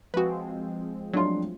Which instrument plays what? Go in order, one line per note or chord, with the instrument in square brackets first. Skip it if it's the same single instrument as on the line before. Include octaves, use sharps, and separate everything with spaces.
[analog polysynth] F3 G#3 C4 [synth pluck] F#4 B4
[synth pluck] F#3 A3 F4 [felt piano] D4 C6